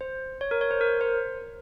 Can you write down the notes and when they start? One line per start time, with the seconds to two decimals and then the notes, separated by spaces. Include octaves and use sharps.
0.01 C5
0.41 C#5
0.51 A#4
0.61 C#5
0.71 C5
0.81 A#4
1.01 C5